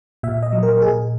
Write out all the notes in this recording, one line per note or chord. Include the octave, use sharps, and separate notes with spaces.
A#2 E5
D#5
F#3
A#4
A#2 G#4